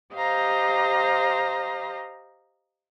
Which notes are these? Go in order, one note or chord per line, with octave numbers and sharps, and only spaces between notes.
G4 C5 D#5 F5 A#5